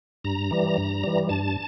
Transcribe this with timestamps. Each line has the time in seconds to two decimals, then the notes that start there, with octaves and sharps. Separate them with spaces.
0.24 G2 A#5
0.51 E3 G3
0.78 G2
1.04 E3 G3
1.29 G2 A5